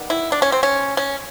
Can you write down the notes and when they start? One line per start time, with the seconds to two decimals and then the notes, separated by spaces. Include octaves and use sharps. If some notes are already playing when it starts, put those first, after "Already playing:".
Already playing: D#3 G3 B3
0.10 E4
0.32 D4
0.42 C#4
0.52 C4
0.63 C#4
0.97 C#4